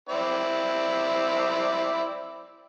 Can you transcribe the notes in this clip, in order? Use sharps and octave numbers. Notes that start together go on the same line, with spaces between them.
C4 E4 D5